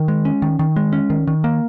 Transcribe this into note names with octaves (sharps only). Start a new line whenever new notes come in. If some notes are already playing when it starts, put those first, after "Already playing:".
Already playing: D#3
G#3
C#4
D#3
D#3
G#3
C#4
D#3
D#3
A#3